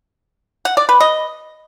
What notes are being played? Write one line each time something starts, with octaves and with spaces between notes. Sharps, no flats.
F#5
D5
B4
D#5